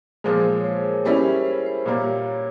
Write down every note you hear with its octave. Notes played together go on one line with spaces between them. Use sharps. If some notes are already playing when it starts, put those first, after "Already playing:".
A#2 F3 G#3 G#4
C5
C#5
C5
A#4
G3 C#4 E4 C5
C5
C5
A#2 G3 A#3 C#5
C#5